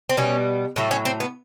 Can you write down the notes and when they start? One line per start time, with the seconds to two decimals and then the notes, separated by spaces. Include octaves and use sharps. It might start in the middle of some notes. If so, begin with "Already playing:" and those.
0.09 C4
0.17 B2 G3 B3 C#4
0.76 A2 F#3 A3
0.91 C#4
1.05 C4
1.20 B3